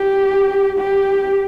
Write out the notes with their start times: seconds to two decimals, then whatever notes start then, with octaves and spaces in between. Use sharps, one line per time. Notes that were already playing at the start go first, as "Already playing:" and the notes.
Already playing: G4
0.78 G4